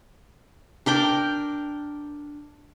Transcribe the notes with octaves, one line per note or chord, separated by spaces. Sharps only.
D4 A#4 G5 D6